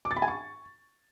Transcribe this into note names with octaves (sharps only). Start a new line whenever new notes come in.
D6
A6
B5
G#5
C#6